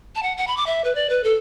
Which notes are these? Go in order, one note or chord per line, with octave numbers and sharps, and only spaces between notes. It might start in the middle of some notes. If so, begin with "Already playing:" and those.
A5
F#5
F#5
B5
D6
E5
B4
D5
B4
A4